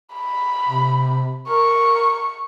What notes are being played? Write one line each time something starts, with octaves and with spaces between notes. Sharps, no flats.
B5
C3
A#4 C#6